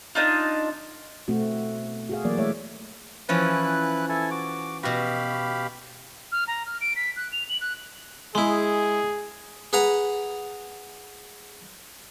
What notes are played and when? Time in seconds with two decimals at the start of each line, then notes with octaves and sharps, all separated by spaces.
0.15 D4 D#4 F4
1.28 B2 A3 C4 F#4
2.10 F#4 G#4 F5
2.24 E3 F#3 A#3 D5
2.38 G#3 A3 C#5 E5
3.29 E3 F3 C#4 E4 B4 F#6
4.09 E4 A4 G#5
4.31 F#4 D6
4.83 B2 F#4 G4 F5 B5
6.32 F6
6.48 A#5
6.66 F6
6.81 D7
6.96 B6
7.16 F#6
7.32 F7
7.49 F#7
7.61 F#6
8.35 G#3 E4 G#4
9.73 G#4 B4 F#5 A#5